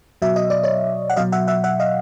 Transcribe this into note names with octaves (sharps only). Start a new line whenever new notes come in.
B2 F#3 E5
D#5
D5
C#5 D#5
F#5
B2 F#3 D#5 F5
E5 F#5
E5 F#5
E5 F#5
D#5 F5